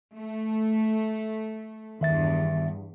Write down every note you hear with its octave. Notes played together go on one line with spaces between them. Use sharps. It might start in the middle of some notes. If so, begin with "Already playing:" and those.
A3
E2 G2 D#3 E5 A6